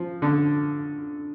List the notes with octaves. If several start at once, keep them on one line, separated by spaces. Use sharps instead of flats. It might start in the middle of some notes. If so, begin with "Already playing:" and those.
Already playing: F3
D3